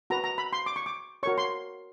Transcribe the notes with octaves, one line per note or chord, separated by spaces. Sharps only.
F#4 B4 A#5
A#5
B5
C6
D6
C#6
D6
F#4 A#4 C#5 C#6
C6